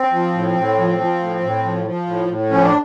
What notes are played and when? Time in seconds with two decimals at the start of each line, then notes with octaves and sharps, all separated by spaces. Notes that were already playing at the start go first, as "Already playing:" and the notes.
Already playing: C4
0.11 F3
0.33 A2
0.55 A2
0.77 F3
0.98 F3
1.20 A2
1.41 A2
1.63 F3
1.84 F3
2.06 A2
2.28 A2
2.50 F3 C#4
2.62 D4